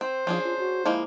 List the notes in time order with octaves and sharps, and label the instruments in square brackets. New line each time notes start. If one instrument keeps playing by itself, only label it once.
[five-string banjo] C4 [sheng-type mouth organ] C5
[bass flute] F3 [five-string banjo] C#4 D4 G#4
[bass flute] F4
F#4
[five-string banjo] F3 G#3 A#3 [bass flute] E4